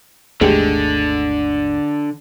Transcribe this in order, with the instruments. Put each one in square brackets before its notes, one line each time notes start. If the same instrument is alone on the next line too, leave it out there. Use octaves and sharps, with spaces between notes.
[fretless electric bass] G#1 D#2 A3 [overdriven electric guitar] D3 [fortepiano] G#3 G4